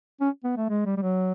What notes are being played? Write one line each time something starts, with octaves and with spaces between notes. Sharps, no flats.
C#4
B3
A3
G#3
G3
G3
F#3